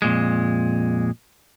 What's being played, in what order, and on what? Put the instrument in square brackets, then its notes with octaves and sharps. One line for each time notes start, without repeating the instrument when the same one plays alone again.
[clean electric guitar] F2 A#2 G#3